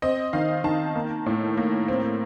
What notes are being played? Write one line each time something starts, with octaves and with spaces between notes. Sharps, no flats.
C4 D#5
D#3 F5
D#3 A5
A#3
A2
A#3
C4